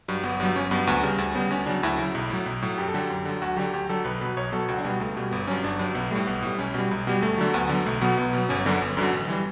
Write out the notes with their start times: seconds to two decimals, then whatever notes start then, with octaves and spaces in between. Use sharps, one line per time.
0.08 G2 F#3
0.23 G1 B3
0.40 G2 F#3
0.56 G1 C#4
0.71 G2 F#3 B3
0.87 D2 B3
1.03 C#3 G3
1.18 D2
1.34 C#3 G3 B3
1.50 D2 C#4
1.66 C#3 F#3 D4
1.83 D2 E4
1.98 C#3 F#3 E4
2.15 B1
2.30 A2 F#3
2.46 B1
2.62 A2 F#3
2.78 F#2 G4
2.88 A4
2.94 D3 F#3 G4
3.10 F#2
3.25 D3 F#3
3.42 D2 F#4
3.57 D3 F#3 G4
3.73 D2 G4
3.89 D3 F#3 A4
4.05 B1 B4
4.21 B2 F#3 B4
4.37 B1 C#5
4.52 B2 F#3 A4
4.68 C#2 F#4
4.79 D4
4.84 B2 G3 B3
5.00 C#2 A3
5.17 B2 G3
5.31 G1 B3
5.47 G2 F#3 C#4
5.64 G1 D4
5.79 G2 F#3
5.95 B1 B3
6.11 A2 G3 A3
6.27 B1 B3
6.42 A2 G3
6.58 B1 C#4
6.74 B2 G3
6.91 B1
7.07 B2 G3 B3
7.22 D2 A3
7.38 D3 F#3
7.54 D2 B3
7.69 D3 F#3
7.86 B1 A3
8.01 B2 F#3 B3
8.17 B1 B3
8.33 B2 F#3
8.49 G1 C#4
8.65 F#2 D3 F#3 B3
8.82 G1
8.97 F#2 D3 F#3
9.13 A1
9.29 E3 G3